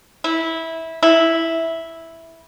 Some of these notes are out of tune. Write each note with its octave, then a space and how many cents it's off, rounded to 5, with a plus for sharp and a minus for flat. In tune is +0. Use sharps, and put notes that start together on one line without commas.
E4 -15
E4 -5